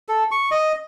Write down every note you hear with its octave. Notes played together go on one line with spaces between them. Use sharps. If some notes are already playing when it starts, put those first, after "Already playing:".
A4
C#6
D#5